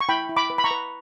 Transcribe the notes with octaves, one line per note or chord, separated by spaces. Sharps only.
C#6
E4 G5 B5
E4
B5 D6
B4
B5
A#5 C#6
B4